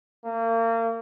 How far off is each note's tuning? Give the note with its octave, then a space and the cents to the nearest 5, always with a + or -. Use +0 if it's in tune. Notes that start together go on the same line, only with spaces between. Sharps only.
A#3 -35